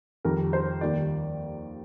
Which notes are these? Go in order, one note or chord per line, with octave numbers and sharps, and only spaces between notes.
F2 D#3 G3 A#4
C5
D#2 D#3 G3 D5